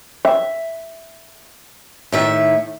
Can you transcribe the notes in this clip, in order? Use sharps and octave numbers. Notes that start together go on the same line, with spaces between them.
E5
A2 D#3 E5